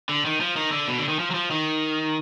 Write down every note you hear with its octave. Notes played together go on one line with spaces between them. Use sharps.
D3
D#3
F3
D#3
D3
B2
D3
D#3
F3
F#3
F3
D#3